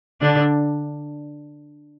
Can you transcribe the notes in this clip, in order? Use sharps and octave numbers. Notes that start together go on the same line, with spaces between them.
D3 D4